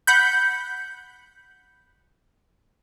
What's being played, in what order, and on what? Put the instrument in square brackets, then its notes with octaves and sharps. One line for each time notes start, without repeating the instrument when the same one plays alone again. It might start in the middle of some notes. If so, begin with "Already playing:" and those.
[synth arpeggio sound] F#5 B5 G6